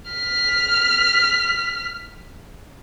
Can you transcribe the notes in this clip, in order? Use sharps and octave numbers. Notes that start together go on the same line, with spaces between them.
F6 B6